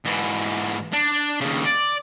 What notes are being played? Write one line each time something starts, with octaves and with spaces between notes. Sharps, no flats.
G#2 E3
D4
D#2 C#3
D5